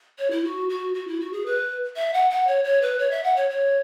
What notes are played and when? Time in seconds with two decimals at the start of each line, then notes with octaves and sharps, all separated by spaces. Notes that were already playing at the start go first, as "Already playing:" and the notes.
0.19 C#5
0.31 E4
0.44 F#4
0.69 F#4
0.94 F#4
1.08 E4
1.20 F#4
1.33 G#4
1.46 B4
1.96 E5
2.14 F#5
2.30 F#5
2.47 C#5
2.64 C#5
2.82 B4
2.99 C#5
3.11 E5
3.24 F#5
3.36 C#5
3.50 C#5